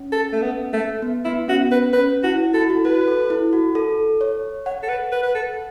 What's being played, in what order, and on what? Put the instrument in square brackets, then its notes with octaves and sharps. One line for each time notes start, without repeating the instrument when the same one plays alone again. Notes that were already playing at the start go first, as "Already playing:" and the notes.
Already playing: [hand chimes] C#4
[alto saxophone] A4
A3
B3
A3
[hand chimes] B3
[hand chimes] B3 [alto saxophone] E4
[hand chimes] C#4 [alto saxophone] F#4
[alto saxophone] B4
[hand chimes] C#4 [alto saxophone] B4
[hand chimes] E4 [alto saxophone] F#4
[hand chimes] F#4 [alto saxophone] A4
[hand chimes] E4
F#4
[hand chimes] F#4 [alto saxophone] B4
[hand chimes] A4
E4
F#4
A4
C#5
[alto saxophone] C#5 [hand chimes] F#5
[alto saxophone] A4
B4
B4
B4
A4